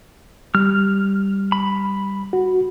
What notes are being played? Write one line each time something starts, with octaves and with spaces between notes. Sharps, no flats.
G3 F6
B5
F#4